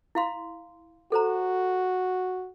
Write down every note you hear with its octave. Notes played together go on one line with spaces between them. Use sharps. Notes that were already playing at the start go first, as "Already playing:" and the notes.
E4 F5 C6
F#4 A4 C5 A#5